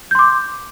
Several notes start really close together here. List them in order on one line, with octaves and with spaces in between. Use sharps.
G6 C6 D6